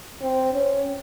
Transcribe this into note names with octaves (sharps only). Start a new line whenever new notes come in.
C4
C#4